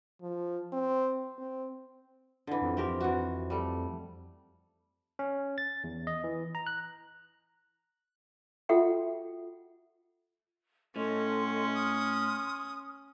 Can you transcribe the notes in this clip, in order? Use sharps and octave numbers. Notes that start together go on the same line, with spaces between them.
F3
C4
C4
D3 E3
F2
C4 G4 A#4
E3 F#4
G3 A3
C#4
A6
E2
D#5
E3
A#5
F#6
F4 F#4 A4 E5 F#5 G5
A2 C#4 A4 D#5 C6
C6 D#6 F6